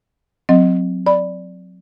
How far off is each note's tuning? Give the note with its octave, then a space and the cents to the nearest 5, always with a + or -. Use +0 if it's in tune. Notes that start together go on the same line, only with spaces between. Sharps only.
F#3 -20 C4 -10 D#5 +0
D5 +0 B5 +0